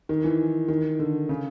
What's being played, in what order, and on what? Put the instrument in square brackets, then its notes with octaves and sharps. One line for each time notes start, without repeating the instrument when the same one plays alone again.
[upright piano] D#3
E3
D#3
D3
C#3